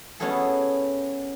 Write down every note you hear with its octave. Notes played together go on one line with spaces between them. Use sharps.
B3 C#4 E4 F#4 G#4 A4